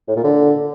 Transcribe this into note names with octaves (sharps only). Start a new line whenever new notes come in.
A2
A#2
D3